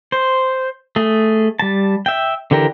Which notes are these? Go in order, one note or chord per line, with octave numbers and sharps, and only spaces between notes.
C5
A3 G#4
G3 A5
E5 G5
D3 E3 G4 A#4